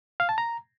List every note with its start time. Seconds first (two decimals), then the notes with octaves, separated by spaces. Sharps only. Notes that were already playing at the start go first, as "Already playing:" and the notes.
0.20 F5
0.29 A5
0.38 A#5